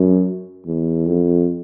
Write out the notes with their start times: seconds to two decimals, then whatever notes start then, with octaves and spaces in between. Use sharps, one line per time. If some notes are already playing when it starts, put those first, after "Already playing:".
Already playing: F#2
0.66 E2
1.07 F2